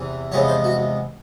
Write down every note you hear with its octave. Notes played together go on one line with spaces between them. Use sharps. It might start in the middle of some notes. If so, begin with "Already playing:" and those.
Already playing: E2 C3 E3
E2 C3 F3 G#3 B3 C#5
C5
F#4